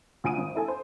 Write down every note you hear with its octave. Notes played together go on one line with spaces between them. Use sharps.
D2 F4 G#5 D#6 D7 D#7
G#1
E4 A4 G#5
C5